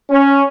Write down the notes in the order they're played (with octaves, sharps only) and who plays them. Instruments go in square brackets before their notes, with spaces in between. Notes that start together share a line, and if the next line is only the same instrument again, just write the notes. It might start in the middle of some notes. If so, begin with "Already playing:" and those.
[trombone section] C#4